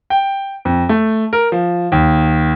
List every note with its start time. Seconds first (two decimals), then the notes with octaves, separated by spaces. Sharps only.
0.10 G5
0.65 F2
0.89 A3
1.33 A#4
1.52 F3
1.92 D#2